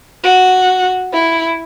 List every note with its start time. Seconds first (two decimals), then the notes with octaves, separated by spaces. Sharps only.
0.23 F#4
1.13 E4